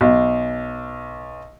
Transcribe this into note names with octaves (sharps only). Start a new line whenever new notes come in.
B1